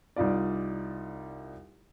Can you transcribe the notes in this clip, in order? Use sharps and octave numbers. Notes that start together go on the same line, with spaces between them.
C2 D#4 F4 D5